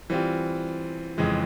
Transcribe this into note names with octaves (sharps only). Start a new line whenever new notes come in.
E3 G3 C4 F4
F2 C#3 E3 G#3